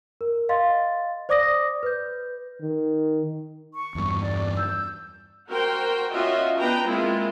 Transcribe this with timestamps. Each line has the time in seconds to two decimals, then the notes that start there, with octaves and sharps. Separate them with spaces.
0.21 A#4
0.49 D#5 F5 C6 A6
1.29 C5 D5 D6 D#6 A#6
1.83 B4 G6
2.62 D#3
3.74 C#6
3.95 E2 G2
4.20 D5
4.57 E6 G6
5.48 F#4 A#4 C5 G5
6.13 C#4 F4 F#4 D#5 E5
6.58 B3 D4 B4 G5 A#5
6.87 G#3 A#3 C4 E4 F4